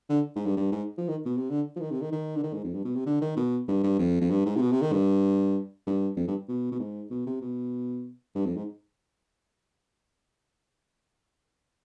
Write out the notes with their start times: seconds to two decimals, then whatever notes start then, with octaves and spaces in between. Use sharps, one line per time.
0.09 D3
0.36 G#2
0.46 G2
0.57 G2
0.72 G#2
0.98 F3
1.08 D#3
1.25 B2
1.37 C3
1.50 D3
1.76 F3
1.80 D#3
1.91 C3
2.01 D#3
2.12 D#3
2.37 D3
2.43 D#3
2.53 G#2
2.64 F2
2.74 G2
2.85 B2
2.96 C3
3.06 D3
3.21 D#3
3.37 B2
3.68 G2
3.83 G2
3.99 F2
4.21 F2
4.30 G2
4.46 G#2
4.56 C3
4.61 B2
4.72 C3
4.82 D#3
4.92 G2
5.86 G2
6.17 F2
6.27 G2
6.48 B2
6.72 B2
6.80 G#2
7.11 B2
7.26 C3
7.41 B2
8.35 G2
8.45 F2
8.56 G#2